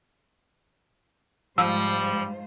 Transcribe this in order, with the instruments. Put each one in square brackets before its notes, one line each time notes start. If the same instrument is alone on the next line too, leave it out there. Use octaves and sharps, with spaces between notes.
[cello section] G#2 C5 [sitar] F3 [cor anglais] G3 [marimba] E6